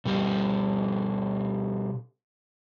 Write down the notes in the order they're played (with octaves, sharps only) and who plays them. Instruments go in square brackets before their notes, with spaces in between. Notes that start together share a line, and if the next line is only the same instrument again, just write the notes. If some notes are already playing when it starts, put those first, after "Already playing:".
[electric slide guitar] B2 G3 G4